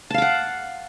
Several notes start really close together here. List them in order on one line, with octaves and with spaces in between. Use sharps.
A5 F5 D6 F#5